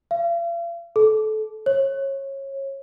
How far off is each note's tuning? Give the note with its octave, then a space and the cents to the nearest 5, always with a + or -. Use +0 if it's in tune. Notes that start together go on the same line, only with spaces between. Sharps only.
F5 -45
A4 -25
C#5 -25